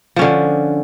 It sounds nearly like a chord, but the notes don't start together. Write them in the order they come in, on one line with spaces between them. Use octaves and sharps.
F3 C#4 D3